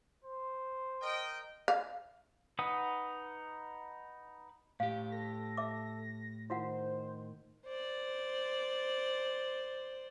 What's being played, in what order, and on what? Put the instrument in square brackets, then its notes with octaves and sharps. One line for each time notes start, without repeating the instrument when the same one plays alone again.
[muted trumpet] C5
[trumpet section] A#4 D#5 G5
[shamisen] F5
[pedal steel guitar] D#4 B4 F#5 D#6
[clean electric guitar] A2 G4 [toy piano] F5
[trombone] A4 [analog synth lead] A#6
[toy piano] E5 D6
[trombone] D#3 [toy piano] E4 F4 F#5 [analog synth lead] C5
[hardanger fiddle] C5 D5